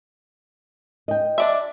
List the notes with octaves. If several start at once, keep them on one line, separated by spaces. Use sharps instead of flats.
D#5 G5
D4 D5 E5